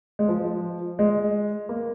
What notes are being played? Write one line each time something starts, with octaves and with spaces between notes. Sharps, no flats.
G#3
F3
G#3
A#3